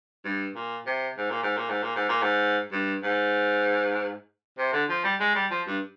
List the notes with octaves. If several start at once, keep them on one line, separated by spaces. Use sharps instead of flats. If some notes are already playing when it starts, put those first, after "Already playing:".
G2
A#2
C3
G#2
A#2
G#2
A#2
G#2
A#2
G#2
A#2
G#2
G2
G#2
C3
D3
F3
G3
G#3
G3
F3
G2